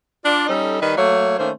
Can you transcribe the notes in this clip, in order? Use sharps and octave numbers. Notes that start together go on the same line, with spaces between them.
D4 F4 D5
G3 C#4 D#4 A4
D#3 G3 B4 D#5
F#3 A3 A#3 C#5
D#3 A3 A#3 C#4 C5